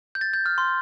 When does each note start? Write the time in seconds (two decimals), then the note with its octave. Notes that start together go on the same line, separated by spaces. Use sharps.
0.15 G6
0.21 A6
0.33 G6
0.46 F6
0.58 C6